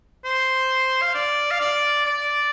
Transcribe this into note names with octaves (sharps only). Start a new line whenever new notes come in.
C5
F5
D5
F5
D5
D5